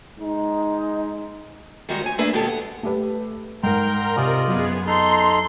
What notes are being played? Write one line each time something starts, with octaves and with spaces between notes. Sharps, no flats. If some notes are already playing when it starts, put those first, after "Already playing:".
G#3 D#4
D#3 G3 G#3 D#4 F#4
D2 C#5 G#5
A3 A#3 D4 G#4 B4 E5
D#2 B2 G#3 B3 G4 A4
F#5
A3 G4 B4
G#2 A#4 G5 A#5 C6
C3 F4 D5 D#5 G#5
F#2 B3 G#4
D#4 A4 A#5 C6